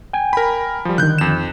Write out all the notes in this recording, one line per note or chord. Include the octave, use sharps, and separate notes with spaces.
G5 G#5
A#4 B5
F3 G3
D3 D#3 F#6 G6
F2 E7